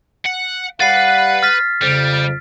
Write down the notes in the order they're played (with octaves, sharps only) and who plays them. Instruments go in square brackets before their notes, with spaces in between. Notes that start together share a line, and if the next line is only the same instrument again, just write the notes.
[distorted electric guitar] F#5
[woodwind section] G3 F5 F#5 [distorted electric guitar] B4 B5 [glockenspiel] A6 C7
[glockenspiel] F6 A6 B6
[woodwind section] F2 C#3 [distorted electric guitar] G3